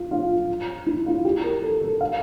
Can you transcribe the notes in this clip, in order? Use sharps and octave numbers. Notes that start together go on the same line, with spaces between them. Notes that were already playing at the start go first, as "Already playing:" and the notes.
Already playing: F4
F4
E4
F4
G4
A#4
A4
A4
F5